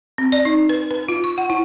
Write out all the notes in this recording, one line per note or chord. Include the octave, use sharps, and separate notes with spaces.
C4
D5
D#4
B4
B4
F4
C#6
F#5
E4